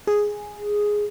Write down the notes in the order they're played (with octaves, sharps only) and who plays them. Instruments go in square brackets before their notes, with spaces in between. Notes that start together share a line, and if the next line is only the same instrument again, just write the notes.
[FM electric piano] G#4